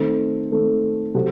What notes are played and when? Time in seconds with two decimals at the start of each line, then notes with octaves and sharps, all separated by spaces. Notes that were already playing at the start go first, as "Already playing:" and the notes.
Already playing: D#3 A3 C4
0.51 D#3 A3 C4
1.14 C3 F#3 C4 F#4 A4